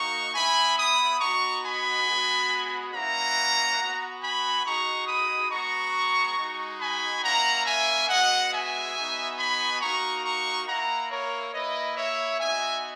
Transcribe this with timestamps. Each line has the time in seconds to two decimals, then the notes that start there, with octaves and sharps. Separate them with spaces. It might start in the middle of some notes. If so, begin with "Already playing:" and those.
Already playing: A#3 D#4 F#4 A#5 C#6
0.34 B3 E4 G#5 B5
0.77 B5 D#6
1.20 B3 D#4 F#4 A#5 C#6
1.63 G#5 B5
2.06 G#3 B3 F#4
2.93 A#3 C#4 E4 F#5 A#5
3.79 B3 F#4
4.22 G#5 B5
4.64 G#3 D#4 F#4 A#5 C#6
5.07 B5 D#6
5.50 G#3 B3 F#4 A#5 C#6
6.37 G#3 D#4 F#4
6.80 G#5 B5
7.22 A#3 C#4 E4 F#5 A#5
7.66 E5 G#5
8.09 G#3 B3 F#4 D#5 F#5
8.52 E5 G#5
8.95 B3 D#4 F#4
9.37 G#5 B5
9.81 A#3 D#4 F#4 A#5 C#6
10.24 A#5 C#6
10.67 A#3 E4 F#5 A#5
11.10 A#4 C#5
11.53 A#3 E4 B4 D#5
11.96 C#5 E5
12.39 B3 D#4 F#4 E5 G#5